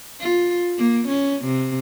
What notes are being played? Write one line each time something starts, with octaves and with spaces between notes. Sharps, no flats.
F4
A#3
C#4
C3